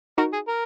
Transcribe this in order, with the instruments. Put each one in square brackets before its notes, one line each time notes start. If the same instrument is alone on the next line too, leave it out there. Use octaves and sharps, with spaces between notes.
[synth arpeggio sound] D#4 F#4 [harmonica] A#4
[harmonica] G#4
A#4